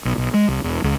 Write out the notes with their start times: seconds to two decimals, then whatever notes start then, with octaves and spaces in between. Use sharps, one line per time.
0.05 B1
0.18 B1
0.34 G#3
0.48 C2
0.64 E1
0.84 C#2